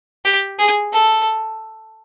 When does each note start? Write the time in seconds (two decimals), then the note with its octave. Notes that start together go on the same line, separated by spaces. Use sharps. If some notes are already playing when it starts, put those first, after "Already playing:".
0.25 G4
0.59 G#4
0.93 A4